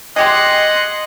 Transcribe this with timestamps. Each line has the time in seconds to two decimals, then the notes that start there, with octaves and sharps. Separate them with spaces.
0.16 G#3 G4 G#4 D#5 F#5 C6